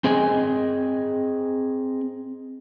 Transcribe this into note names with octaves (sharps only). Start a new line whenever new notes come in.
C4 G#4 D#5 G#5